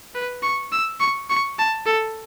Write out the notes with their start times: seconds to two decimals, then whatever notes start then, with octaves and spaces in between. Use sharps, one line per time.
0.15 B4
0.42 C#6
0.72 E6
1.00 C#6
1.30 C#6
1.58 A5
1.86 A4